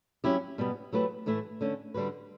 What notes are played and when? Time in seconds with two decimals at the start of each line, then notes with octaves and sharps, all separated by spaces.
0.24 F#3 C#4 E4 G4
0.58 B2 G3 B3
0.93 F#3 A3 E4 G4 B4
1.26 A2 E3 A3 E4
1.61 D3 A3 C#4
1.94 D3 G3 D4 F#4 B4